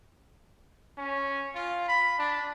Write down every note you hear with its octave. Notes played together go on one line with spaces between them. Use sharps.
C#4
F4
B5
D4